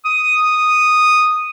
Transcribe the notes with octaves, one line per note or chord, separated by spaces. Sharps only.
D#6